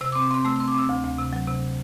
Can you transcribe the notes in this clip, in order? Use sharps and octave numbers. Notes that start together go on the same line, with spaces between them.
C3 E6
C4 D6
C4 C6
A3 E6
C4 E6
D6
C4 E6
D2
D2
C3
F#3
C3